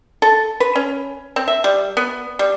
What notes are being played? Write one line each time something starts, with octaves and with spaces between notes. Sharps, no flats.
A4
B4
C#4
C4
E5
G3
B3
G3